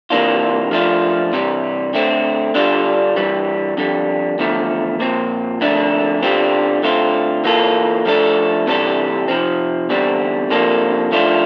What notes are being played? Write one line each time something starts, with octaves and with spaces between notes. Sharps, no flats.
C3 E3 A#3 D4 F4
F3 A3 D4 F4
C3 E3 G3
D3 A3 C4
D3 G3 D4 F4
G2 E3 G3
F2 D3 G3
E2 D3 F3 A3
A#2 F3 C4
F2 D3 A3 D4
G2 D3 G3 C4 F4
D3 A3 C4 F4
E3 A#3 F4 A4
F3 A3 D4 A4
C3 E3 G3 D4 A4
C3 F3 C4
E2 D3 G3 C4
C3 F3 A#3 D4 A4
F3 A3 D4 F4